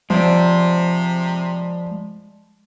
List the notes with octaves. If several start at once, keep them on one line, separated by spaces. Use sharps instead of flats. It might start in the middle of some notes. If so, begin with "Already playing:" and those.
C3 F3 G#3 C5 D5